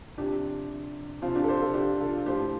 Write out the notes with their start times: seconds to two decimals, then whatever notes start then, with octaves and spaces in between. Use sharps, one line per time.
0.18 C3 F3 D4 G4
1.22 C3 F3 C4 F4
1.35 D4 G4
1.44 A4
1.48 G4 C5
1.62 F4 A4
1.74 D4 G4
2.00 F4 A4
2.26 A2 F3 G4 C5